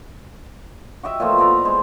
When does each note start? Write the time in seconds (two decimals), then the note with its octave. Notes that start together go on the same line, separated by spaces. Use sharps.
1.03 F#4 G4 D#5 E5
1.20 A#2 E3 F3 A3
1.38 B3 D5 A#5 B5
1.65 G#3 C5